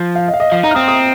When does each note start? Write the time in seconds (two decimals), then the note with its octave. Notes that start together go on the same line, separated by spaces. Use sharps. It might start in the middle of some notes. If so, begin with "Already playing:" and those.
Already playing: F3
0.15 F5
0.28 D#5
0.34 F5
0.40 D#5
0.52 F3 F5
0.63 D#4 A#5
0.71 F6
0.75 C4 D#6
0.88 D#6